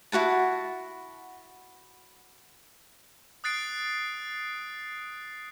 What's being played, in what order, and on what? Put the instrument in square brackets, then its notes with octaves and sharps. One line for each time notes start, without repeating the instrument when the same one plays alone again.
[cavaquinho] E4 F#4 F#5 A5
[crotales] D#6 F#6 A6 C7 D7